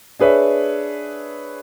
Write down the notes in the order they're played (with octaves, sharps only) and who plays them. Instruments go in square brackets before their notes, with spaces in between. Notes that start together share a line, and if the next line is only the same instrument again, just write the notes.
[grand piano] D4 G#4 B4 C#5 E5